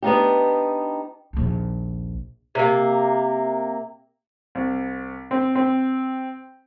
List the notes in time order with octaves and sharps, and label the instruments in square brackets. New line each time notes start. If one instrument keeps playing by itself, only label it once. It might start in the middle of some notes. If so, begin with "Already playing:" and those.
[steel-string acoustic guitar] B3 D4 D#4 G4
[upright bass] A#1 D#2
[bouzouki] C3 A#3
[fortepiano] C2
C4
C4